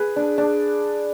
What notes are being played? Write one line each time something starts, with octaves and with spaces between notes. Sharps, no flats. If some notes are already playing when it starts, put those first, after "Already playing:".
Already playing: G#4 B4
D4
D4